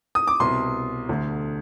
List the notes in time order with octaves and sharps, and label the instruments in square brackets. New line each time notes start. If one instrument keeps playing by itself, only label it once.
[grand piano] D#6
D6
C2 B2 C6
D2 D3